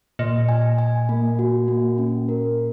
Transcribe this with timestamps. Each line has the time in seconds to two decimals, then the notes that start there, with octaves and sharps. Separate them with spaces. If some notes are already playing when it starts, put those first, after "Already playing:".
0.19 A#2 D#5
0.49 G#5
0.78 G#5
1.09 A#3
1.39 F#4
1.68 A#3
1.98 C#4
2.29 A#4